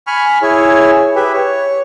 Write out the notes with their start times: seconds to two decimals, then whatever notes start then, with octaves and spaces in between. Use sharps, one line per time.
0.07 G#5 B5 C#6 F6
0.42 E4 G#4 C#5
1.16 G4 B4 E5
1.33 C#5